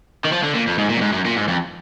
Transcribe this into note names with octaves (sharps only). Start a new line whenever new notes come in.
D#3
F3
D3
A#2
F2
G#2
A#2
F#2
G#2
F#2
A#2
G#2
F2